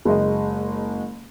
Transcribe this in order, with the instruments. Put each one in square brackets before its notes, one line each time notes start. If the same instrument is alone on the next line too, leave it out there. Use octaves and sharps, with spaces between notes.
[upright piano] F#1 G#3 D#5